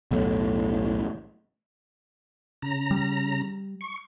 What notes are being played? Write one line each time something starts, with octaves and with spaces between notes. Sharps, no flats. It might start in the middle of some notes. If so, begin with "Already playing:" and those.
B1 E2 A2
C#3 A#5
G3
C#6